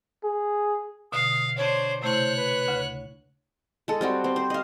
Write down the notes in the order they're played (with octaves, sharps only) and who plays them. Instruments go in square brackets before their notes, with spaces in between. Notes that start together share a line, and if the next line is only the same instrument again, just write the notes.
[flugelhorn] G#4
[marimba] B2 D3 [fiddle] F5 [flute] D#6
[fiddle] D4 C5 [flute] C#5
[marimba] C3 A3 E4 [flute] C5 [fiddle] C#5 F#6
[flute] B4
[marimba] D2 C#3
[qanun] G#3 A4
G3 C4 F#4
C4
C5
D#5 F5